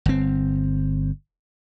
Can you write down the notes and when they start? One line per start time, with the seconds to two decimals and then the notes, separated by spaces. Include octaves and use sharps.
0.06 G1 C4